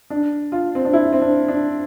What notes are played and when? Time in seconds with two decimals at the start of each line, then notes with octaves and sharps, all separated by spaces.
0.10 D4
0.52 F4
0.75 C4
0.85 D4
0.93 E4
1.13 C4
1.21 D4
1.48 D4